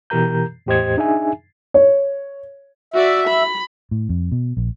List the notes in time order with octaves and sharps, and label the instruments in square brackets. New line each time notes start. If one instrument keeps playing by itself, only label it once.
[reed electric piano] B2 E3 G4 A#4 A#5 G6
E2 A2 G4 C5 D#5 G#6
D4 D#4 G#4 E5 G#5
[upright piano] C#5
[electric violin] F#4 D5 [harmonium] E5
[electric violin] B5
[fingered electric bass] A2
F2
B2
A#1